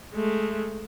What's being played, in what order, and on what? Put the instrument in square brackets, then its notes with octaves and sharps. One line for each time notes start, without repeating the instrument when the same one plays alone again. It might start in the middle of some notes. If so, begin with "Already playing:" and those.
[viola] G#3 A3